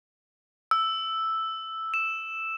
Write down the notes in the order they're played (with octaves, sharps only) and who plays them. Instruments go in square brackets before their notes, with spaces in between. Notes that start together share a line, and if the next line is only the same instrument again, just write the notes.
[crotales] E6
E7